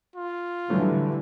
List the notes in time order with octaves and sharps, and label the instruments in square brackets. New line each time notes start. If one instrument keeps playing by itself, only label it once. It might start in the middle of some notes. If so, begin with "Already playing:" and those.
[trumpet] F4
[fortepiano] A2 F#3 [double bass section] D3 E3 G3 [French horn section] B4